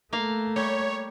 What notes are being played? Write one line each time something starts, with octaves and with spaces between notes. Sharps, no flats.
A3 A#3 F5
G3 C#5